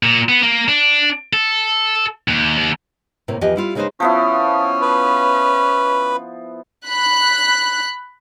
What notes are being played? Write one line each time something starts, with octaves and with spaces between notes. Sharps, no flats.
A#2
B3
A#3
D4
A4
D#2
D#2
A2 C3 A#3 E4
E2 F3 G4 B4 D#5 G#5
G3 E4 F4
C#3 G#3 D#4 G#4 B4 C5
F3 B3 C#4 E4
B4
B5 F#6